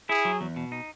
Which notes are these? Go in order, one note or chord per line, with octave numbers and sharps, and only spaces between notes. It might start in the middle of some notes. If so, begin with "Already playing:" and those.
E4 G#4
F#3
E2
B2
D#4